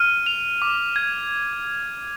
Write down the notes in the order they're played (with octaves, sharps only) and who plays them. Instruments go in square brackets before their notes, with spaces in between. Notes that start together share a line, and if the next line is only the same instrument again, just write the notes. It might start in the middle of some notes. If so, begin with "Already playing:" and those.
Already playing: [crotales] F6 D#7
F7
D6
G#6